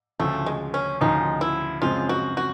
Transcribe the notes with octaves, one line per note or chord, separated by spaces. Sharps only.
D2 C#3 F3 A3
G#3
C#4
D2 C#3 F3 D#4
E4
F#2 C#3 F3 G#3 C4 F4
F#4
F#4